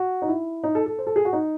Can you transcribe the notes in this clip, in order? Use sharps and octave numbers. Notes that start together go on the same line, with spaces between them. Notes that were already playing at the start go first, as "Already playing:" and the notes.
Already playing: F#4
D#4
E4
D#4
A4
A4
C5
A4
G#4
F#4
D#4